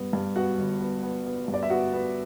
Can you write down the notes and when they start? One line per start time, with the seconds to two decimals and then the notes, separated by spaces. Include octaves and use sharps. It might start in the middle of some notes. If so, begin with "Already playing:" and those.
Already playing: G2 B3
0.13 G2
0.36 B3 F#4 F#5
0.58 G1
0.81 B3
1.03 B3
1.26 B3
1.48 G2
1.54 D5
1.63 E5
1.70 B3 F#4 F#5
1.93 B3